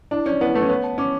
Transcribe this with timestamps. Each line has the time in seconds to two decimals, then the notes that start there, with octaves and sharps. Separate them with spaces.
0.11 D4 E4
0.26 C#4 D5
0.41 B3 E4
0.55 A3 B4
0.62 C#4
0.69 B3 C#5
0.84 A5
0.98 C#4 D6